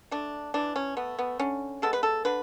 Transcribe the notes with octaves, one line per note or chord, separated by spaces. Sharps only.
A3 D4
E3 D4
C#4
A3 B3
B3
D3 C#4
G#3 B3 A4
B4
A4
D3 B4